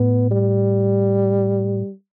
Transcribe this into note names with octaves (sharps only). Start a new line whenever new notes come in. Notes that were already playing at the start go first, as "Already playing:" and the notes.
Already playing: A2 B3
G3